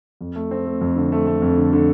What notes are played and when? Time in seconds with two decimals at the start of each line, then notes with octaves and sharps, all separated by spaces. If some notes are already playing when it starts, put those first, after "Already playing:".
0.21 F2
0.36 A3
0.51 C4
0.66 A3
0.81 F2
0.96 D3
1.12 A3
1.27 A3
1.42 F2
1.57 D3
1.73 D3